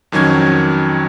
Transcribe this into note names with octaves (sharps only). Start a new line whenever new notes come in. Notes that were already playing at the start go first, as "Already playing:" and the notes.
F2 D#3 F#3 C#4 G#6